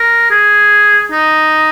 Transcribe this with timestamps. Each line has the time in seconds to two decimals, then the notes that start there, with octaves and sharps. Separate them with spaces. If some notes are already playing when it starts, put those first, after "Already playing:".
Already playing: A#4
0.30 G#4
1.11 D#4